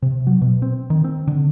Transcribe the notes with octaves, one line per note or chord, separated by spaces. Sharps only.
C3
F#3
B2
C4
D#3
C4
D3